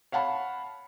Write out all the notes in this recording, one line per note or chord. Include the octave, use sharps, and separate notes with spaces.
C#5 F5 F#5 A5 B5